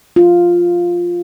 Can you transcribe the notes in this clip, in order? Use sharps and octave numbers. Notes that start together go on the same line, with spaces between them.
F4